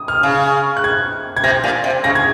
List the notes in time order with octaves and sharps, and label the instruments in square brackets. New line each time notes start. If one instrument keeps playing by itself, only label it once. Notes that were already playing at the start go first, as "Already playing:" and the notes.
Already playing: [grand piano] D#6
F6
[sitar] C#3
[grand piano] F#6
G#6
G#6
[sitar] C3 [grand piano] A#6
[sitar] A#2
C3
[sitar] C#3 [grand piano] A#6
[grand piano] G#6